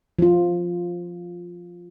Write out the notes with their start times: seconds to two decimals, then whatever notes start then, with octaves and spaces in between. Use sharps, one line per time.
0.19 F3 F4